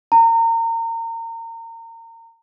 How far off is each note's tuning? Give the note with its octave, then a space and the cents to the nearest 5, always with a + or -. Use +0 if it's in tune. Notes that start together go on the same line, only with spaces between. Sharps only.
A#5 -30